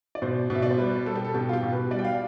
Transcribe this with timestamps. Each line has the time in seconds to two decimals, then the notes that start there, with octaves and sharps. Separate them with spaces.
0.15 D5
0.22 B2 C5
0.50 B2 E5
0.62 D5
0.71 C5
0.78 G3 B4
1.06 G3 A4
1.15 G4
1.25 A4
1.34 B2 G4
1.49 F4
1.53 G4
1.63 B2
1.72 B4
1.91 G3 D5
1.99 G5
2.05 F5